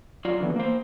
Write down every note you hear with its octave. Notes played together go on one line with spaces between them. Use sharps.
F#3 F4 D5
D3 E3 B3
A#3 C5